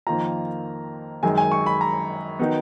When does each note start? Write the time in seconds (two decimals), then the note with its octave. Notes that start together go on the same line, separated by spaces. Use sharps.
0.07 F2 D#3 A#3 F4 A#5
1.23 F#2 D#3 G#3 G#5
1.38 G#5
1.52 C#6
1.66 B5
1.81 A#5
2.39 D#3 F#3 B3 D#4